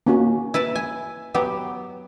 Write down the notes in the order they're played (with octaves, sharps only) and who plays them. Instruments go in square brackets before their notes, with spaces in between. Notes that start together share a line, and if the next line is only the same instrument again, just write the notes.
[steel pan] A#3 C#4 F#4
[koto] E4 B4 A5
G#5
F#3 B3 G4